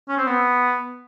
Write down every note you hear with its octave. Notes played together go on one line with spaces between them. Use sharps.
C#4
C4
B3